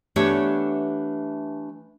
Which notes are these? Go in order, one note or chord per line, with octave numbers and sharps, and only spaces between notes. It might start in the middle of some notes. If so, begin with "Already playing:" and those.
E3 A3 B3 D4 G4 C#5